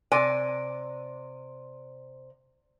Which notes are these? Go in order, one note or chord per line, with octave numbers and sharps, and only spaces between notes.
C3 D5 G#5